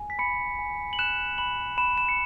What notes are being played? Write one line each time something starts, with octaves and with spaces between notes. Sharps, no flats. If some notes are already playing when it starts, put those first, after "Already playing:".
Already playing: G#5
B6
B5 C#7
G#5
F#7
F#6 E7
B5 F#7
B5 E7
E7
C#7